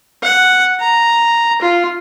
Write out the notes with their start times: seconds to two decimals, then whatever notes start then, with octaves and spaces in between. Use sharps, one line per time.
0.23 F#5
0.80 A#5
1.61 F4